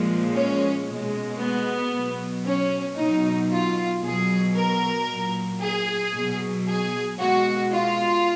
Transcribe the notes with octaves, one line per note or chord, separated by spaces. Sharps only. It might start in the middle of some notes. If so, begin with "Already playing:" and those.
Already playing: A#2 F3 G#3
C#4
B2 G#3
B3
B2 F#3
C#4
B2 F#3 D#4
F4
B2 F#3 G#4
A#4
A#2 F#3
G#4
B2 F#3
G#4
B2 G#3 F#4
F4